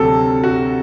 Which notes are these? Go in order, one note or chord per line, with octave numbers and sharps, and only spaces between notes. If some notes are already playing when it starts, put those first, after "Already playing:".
Already playing: D2 C3 F#3 A4
F#4